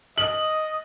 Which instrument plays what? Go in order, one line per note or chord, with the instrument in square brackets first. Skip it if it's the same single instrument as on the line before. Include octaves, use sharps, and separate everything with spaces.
[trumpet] D#5 [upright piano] F#7